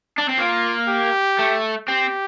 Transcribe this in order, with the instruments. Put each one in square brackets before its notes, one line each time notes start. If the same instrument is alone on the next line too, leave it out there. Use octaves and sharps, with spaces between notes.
[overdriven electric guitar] D4
C4
[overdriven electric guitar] A#3 [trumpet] F4
[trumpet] G4
[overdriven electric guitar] A3
[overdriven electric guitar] C4 [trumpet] G4